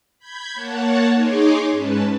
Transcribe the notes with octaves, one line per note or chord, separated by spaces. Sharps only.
B5 G6 G#6
A#3 C#5 F#5 A5
D#4 G#4 C#5 C6 D6
G#2 C#4 B4 A5